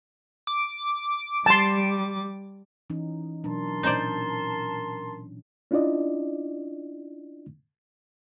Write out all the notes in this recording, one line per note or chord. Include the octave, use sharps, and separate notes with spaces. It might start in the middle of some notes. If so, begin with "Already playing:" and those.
D6
G3 A5 C6
E3 C#4 D#4
B2 F#3 D4 A#4 A5 C6
A#2 C#4 D#4 C5 D5
C#4 D4 E4 F4 D5 D#5